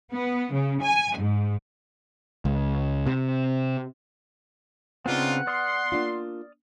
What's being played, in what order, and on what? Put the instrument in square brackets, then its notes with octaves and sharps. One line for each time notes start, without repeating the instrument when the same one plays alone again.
[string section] B3
C#3
G#5
G#2
[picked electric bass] C#2
C3
[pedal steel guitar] C#3 C4 [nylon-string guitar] B3 [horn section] D4 D#4 F4 [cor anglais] F#5
[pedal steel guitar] D5 D#6 F6 [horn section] C6
[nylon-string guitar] A#3 D4 F4